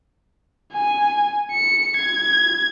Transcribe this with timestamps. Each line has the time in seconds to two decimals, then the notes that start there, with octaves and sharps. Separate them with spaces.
0.73 G#5
1.51 C#7
1.96 G#6